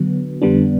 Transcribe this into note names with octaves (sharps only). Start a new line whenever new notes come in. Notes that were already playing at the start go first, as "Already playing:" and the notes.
Already playing: D3 F#3 B3
F2 D3 G3 B3 D4